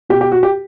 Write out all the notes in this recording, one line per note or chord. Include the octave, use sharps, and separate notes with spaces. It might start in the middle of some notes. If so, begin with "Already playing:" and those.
B2 G4
G4
F#4
G4